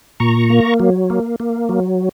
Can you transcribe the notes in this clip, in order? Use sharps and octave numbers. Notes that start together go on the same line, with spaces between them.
A#2 A#5 C#6
A#3
F#3
A#3
A#3
F#3